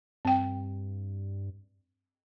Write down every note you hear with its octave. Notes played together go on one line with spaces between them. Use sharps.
G2 C4 G5